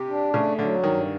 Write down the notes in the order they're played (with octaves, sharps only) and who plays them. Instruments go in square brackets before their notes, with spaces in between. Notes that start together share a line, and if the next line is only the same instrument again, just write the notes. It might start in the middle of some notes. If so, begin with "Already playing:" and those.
Already playing: [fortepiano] C3 [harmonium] G4
[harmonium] D4
[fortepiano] C#3 [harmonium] A3
[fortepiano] D3 [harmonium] F#3
[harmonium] G2 [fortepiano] D#3